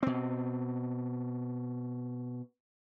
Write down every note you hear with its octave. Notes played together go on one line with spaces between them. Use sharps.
B2 C4